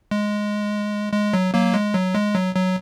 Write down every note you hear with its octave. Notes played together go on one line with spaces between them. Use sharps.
G#3
G#3
F#3
F#3 A#3
G#3
F#3
G#3
F#3
F#3